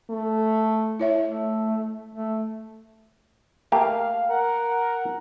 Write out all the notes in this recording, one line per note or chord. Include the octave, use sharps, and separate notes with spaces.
A3
E4 C#5 E5
A3
A3
A3 A#3 G4 F5
A#4 F#5